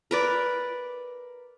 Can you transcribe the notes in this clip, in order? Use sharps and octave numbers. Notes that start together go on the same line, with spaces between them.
A#4 B4 D5